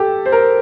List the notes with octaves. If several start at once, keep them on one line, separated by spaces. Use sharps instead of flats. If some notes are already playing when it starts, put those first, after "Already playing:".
Already playing: G4 A4
C5
A#4